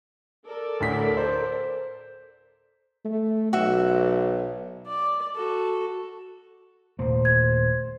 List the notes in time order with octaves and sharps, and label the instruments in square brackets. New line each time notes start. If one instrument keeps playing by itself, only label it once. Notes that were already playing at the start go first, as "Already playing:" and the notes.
[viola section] A4 A#4 D5
[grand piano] D2 A2 B6
C5
[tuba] A3
[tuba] B1 [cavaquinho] F#4 E5
[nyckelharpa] D5
F#4 A4
[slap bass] D#1 A#2 A3 [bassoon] C5
[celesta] G#6